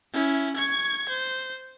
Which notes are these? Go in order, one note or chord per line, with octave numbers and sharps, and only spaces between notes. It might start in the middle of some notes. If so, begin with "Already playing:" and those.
C#4 E4
C#6 G#6
C5